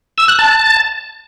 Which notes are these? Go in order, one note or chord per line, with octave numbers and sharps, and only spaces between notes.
E6
F#6
A5